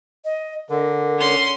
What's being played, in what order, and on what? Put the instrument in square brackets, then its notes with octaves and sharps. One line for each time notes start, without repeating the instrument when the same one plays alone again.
[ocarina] D#5
[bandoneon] D3 [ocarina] A#4
[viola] C#4 C6